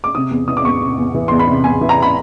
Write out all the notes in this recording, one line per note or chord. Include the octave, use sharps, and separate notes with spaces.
D6
C3 D#6
E2
E3 D#6
D6
E2 C#6
C3
E2
E3
E2 C6
B5
C3
E2 G#5
E3
A#5
B5